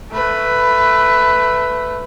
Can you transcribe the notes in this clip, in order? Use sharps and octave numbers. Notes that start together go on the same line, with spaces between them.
A3 B4